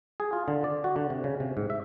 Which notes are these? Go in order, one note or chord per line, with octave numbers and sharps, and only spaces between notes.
G#4
F4
D3
D5
F#4
D3
C3
C#3
C3
G#2
E5